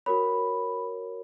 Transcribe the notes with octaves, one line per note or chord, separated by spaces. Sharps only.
F#4 A#4 C#5 B5